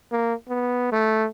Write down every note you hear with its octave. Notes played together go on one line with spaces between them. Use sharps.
A#3
B3
A3